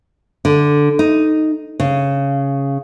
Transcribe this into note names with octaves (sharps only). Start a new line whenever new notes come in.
D3
D#4
C#3